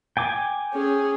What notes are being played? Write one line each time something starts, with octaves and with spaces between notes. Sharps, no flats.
G5 G#5 D6
C#4 G#4